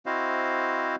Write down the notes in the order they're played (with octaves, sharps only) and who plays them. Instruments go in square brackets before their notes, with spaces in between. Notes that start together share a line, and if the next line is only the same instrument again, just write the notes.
[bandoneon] C4 E4 F#4 C5 D#5 F5